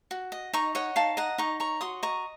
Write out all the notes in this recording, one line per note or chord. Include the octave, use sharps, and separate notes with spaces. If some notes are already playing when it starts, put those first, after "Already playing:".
F#4
D#5
D#4 A#5 C#6
C#5 D#5 F#5
D#4 F5 A5
D#5 F#5 A#5
D#4 A#5 C#6
C#5 A#5 C#6
F#4 C6 D#6
D#5 A#5 C#6